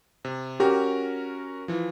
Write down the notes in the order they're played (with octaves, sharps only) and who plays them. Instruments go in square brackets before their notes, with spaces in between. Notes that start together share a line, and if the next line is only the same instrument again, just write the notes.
[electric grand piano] C3
[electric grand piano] C#4 F#4 A#4 [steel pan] G4
[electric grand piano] E3 F3